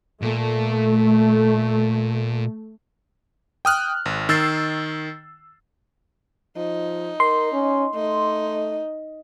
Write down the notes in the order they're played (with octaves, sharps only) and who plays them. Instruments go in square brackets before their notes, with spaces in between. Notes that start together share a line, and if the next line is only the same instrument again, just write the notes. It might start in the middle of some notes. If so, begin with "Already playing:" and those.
[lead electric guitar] A#2 [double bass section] A3
[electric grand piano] G5 D#6 F6 F#6
G#1
D#3 E6 A6 C7
[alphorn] F3 [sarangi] D#4
[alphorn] A#4 [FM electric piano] C6
[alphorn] C#4
[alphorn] A3 [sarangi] D#4